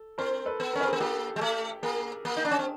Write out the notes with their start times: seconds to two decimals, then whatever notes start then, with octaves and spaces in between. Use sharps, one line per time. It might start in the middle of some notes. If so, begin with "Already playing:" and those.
Already playing: A4
0.18 C4 A#4 C5
0.46 A4 B4
0.60 B3
0.73 C#4 A#4
0.80 B4
0.83 C4
0.87 G#4 A#4
0.93 B3
1.00 A#3 G4 A4
1.36 G#3
1.41 A3
1.83 A#3 G#4 A#4
2.25 A#3
2.37 D#4
2.45 D4
2.51 C#4
2.59 C4